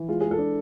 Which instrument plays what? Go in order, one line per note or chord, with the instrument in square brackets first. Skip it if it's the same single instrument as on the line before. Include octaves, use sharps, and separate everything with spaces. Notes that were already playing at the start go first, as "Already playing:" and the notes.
Already playing: [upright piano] E3
[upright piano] G#3 [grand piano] F4
[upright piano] G#3 [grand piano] G#4
[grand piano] A4
[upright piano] D4